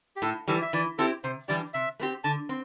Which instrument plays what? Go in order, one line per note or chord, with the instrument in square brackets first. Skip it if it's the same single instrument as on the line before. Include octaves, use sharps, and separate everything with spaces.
[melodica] G4
[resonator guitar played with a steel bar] A2 [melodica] A4
[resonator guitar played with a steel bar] E3 G3 [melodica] A4
[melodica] E5
[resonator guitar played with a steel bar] E3 [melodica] D5
[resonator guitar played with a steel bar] C4 E4 G4 [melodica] A4
[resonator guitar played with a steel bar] C3 [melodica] C5
[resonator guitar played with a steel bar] E3 G3 D4 G4 [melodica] D5
[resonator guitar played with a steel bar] C3 [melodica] E5
[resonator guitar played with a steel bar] A3 C4 G4
[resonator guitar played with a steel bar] D3 [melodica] A5
[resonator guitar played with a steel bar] C4